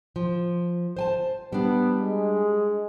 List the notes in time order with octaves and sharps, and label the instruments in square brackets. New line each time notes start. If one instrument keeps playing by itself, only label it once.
[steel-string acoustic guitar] F3
C5 G#5 A5
[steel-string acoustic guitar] G3 D4 [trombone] B3
[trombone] G#3